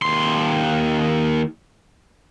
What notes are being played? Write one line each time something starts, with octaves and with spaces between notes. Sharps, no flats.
D#2 C6